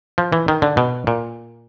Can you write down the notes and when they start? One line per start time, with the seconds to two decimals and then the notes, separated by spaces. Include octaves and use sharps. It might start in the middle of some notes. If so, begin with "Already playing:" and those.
0.18 F3
0.32 E3
0.48 D#3
0.62 D3
0.77 B2
1.07 A#2